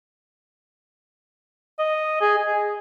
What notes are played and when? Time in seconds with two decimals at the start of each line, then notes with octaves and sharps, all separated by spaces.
1.79 D#5
2.21 G#4
2.38 G#4